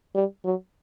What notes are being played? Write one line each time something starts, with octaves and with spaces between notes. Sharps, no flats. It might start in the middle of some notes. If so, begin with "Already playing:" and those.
G3
F#3